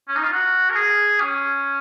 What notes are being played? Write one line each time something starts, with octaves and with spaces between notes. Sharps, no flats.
C#4
D#4
F4
F#4
A#4
G#4
C#4